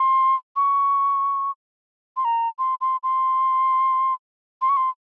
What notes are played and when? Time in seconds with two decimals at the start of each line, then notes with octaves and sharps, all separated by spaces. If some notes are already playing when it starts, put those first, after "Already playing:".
Already playing: C6
0.56 C#6
2.17 C6
2.25 A#5
2.59 C6
2.81 C6
3.03 C6
4.62 C6
4.69 C#6
4.77 C6